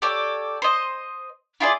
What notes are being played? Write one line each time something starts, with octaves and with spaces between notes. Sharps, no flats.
G4 A4 C#5 D5
C5 D#5
E4 F4 G#4 D5